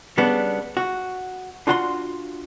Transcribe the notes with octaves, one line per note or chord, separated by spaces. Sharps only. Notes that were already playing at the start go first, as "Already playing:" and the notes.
C#3 G3 B3 D4
F#4
D4 F4 F#4 F#5 G#5 C6